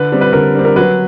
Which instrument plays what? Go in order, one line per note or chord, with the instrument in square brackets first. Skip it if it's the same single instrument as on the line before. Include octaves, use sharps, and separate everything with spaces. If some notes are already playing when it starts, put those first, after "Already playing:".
Already playing: [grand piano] D3 [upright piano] B4
[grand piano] G3 C4
[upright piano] B4
[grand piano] D3 [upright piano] A#4
[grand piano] G3 C4
[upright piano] A#4
[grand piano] F#3 [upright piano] B4